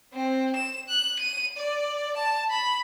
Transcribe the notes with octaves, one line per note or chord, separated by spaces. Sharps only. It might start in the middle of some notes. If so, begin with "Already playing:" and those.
C4
E7
F#6
D#7
D5
A5
B5